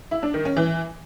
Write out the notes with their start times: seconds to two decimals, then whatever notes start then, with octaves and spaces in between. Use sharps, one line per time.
0.11 E4
0.23 D4
0.34 D#3
0.45 C#4
0.57 E3